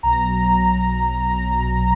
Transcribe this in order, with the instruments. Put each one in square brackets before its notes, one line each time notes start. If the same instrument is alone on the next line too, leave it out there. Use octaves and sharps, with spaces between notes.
[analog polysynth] B1 B2 F#3 A#5